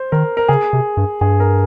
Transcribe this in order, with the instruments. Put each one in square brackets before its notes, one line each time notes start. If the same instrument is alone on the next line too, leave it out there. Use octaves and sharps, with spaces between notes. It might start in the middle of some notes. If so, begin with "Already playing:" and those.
Already playing: [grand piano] C5
[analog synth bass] D#3 [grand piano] A#4
[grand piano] A#4
[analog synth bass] C#3 [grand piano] G#4
[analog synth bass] C3
G2
[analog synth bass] G2 [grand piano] G#4
[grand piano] A#4